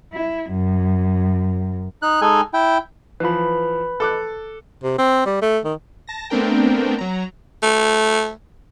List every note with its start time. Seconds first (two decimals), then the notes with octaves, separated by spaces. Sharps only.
0.13 E4
0.50 F#2
2.02 D#4 F#6
2.21 G#3 D#4 A4 G#5
2.54 E4 G5
3.20 E3 F3 B4 B5
4.00 A4 D6 F#6
4.83 C3
4.98 C4
5.26 G3
5.42 A3
5.65 D#3
6.07 A5 A#6
6.30 A3 B3 C4 D4 A#4 G5
6.98 F#3 A#5
7.63 A3